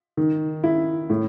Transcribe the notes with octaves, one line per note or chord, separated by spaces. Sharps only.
D#3
E4
A2